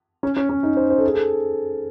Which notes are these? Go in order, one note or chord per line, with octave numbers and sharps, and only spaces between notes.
C#4
C#4
C#4
D#4
C5
C5
A4
G#4
A4